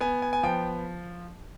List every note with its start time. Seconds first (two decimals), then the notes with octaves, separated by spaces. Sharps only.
0.01 B3 G#5
0.22 G#5
0.33 G#5
0.43 F3 G5